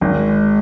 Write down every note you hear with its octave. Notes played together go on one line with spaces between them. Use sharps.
G#1 G#3